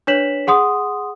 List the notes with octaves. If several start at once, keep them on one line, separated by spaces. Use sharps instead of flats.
D4 B4 C#5 B6 E7 F#7
G#4 F#5 C6 D#6